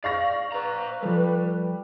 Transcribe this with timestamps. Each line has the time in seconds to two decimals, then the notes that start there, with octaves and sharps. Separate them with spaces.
0.04 D5 F5 C#6 A#6
0.52 B4 C5 A#5
1.03 F3 G3 A4